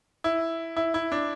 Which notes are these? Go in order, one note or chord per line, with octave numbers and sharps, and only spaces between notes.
E4
E4
E4
D4